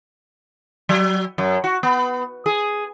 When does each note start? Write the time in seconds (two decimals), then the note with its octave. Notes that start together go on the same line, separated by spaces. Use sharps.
0.89 F#3
1.38 F#2
1.64 F#4
1.83 B3
2.46 G#4